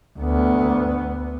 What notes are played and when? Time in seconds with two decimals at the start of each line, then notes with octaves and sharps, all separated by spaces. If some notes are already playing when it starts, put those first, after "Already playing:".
0.19 D2 B3